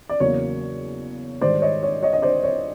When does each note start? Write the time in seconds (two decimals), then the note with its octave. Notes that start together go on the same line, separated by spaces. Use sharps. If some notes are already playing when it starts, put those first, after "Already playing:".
0.09 D5
0.20 E2 C#3 F#3 A#3 C#5
1.41 G#2 D#3 G3 C5 D5
1.62 C#5 D#5
1.83 C#5
2.03 C#5 D#5
2.13 D#5
2.22 C5 D5
2.44 C#5